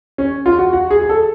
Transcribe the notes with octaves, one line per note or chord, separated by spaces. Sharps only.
C#4
F4
F#4
F#4
G#4
G#4
A4